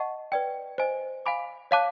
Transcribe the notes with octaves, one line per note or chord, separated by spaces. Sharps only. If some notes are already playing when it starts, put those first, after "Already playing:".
Already playing: D#5 F#5 A5 C#6
B4 D5 G5
C5 D#5 G#5
F5 G#5 B5 D6
C#5 F5 A5 D6 F#6